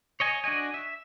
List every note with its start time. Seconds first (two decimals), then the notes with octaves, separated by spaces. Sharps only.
0.20 C#5 D#5 G#5
0.44 D4 F#4 D#5 G#5
0.74 E5